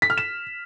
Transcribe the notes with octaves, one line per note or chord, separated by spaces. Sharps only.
B6
F6
E7